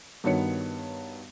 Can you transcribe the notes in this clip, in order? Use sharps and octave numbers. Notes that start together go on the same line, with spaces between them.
G2 D#3 B3 F#4 C#5 C#7